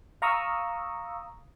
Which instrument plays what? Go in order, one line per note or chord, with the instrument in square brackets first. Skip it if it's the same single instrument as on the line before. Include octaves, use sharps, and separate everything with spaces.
[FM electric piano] F5 A#5 C#6 D#6 E6